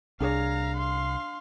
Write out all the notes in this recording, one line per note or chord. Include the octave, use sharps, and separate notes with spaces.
C2 D4 G#4 C#5 F5 A#5
F5 C6